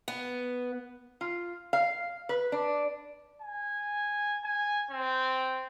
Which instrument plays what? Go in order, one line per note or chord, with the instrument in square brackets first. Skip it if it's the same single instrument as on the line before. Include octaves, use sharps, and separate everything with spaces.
[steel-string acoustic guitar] B3
[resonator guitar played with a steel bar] F4
F5
B4
D4
[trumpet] G#5
G#5
C4